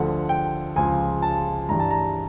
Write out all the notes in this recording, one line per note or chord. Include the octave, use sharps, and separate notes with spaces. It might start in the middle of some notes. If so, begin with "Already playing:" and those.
Already playing: D2 D3 F3 F#5
G5
C#2 C#3 F3 G#5
A5
G2 E3 G3 A#5
A5
A#5